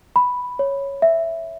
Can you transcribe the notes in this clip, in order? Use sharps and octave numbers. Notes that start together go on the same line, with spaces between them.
B5
C#5
E5